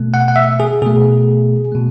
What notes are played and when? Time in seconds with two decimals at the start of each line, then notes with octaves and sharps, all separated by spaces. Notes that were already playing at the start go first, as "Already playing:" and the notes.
Already playing: B2 A3
0.14 F#5
0.28 F#5
0.36 E5
0.60 G#4
0.82 B2 A3 G#4
1.72 B2 A3